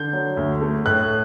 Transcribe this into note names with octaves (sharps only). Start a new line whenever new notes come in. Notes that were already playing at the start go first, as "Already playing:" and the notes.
Already playing: D3 G6
F#3
D2
A3
A2 F#6